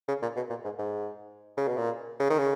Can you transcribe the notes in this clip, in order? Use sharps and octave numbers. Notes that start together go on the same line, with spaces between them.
C#3
A#2
B2
A#2
G#2
G#2
C#3
B2
A#2
C#3
D#3
C#3